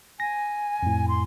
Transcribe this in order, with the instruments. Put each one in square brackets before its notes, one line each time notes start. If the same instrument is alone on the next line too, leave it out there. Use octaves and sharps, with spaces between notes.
[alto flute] G#5 [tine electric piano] A#6
[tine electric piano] F2 A2
[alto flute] C6